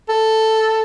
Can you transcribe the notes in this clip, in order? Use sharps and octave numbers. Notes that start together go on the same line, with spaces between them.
A4